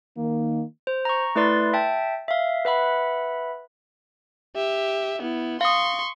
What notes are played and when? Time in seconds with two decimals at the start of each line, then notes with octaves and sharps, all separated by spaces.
0.16 D#3 A#3
0.87 C5
1.05 A#5 C#6
1.35 A3 E4 B4 D5 C6 A6
1.73 E5 G5 A5
2.28 E5 F5
2.65 B4 E5 F#5 B5
4.56 G4 E5
5.22 B3 E4
5.61 F5 C6 C#6 D#6